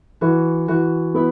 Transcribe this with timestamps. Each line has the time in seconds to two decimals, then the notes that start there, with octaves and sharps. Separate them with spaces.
0.21 E3 F#4
0.68 E3 F#4
1.15 B3 E4